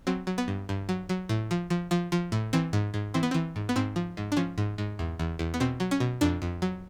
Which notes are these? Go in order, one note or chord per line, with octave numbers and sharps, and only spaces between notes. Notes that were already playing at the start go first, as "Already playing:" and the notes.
F#3 C4
F#3
B3
G2
G2
F#3
F#3
A2
F3
F3
F3
F3
A2
E3 C4
G#2
G#2
E3 C4
B3
E3 C4
G#2
B3
G#2 C4
F3
G#2
D4
F3 C#4
G#2
G#2
E2
E2
E2
B3
B2 C4
F#3
C#4
B2
F2 D4
F2
F#3